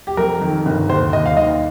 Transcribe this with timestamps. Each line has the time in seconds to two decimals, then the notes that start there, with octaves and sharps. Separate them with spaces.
0.07 G4
0.17 F2 A#4
0.41 D#3
0.66 G1
0.90 D#2 C5
1.13 D#2 D#5
1.26 F5
1.37 D#3 D#5